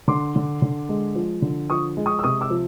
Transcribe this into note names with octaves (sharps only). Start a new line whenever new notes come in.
D3 C6 D6
D3
D3
G#3
F3
D3
F3 C#6 D#6
G#3
C#6 D#6
E6
C3 C#6 D#6
D6 E6
F3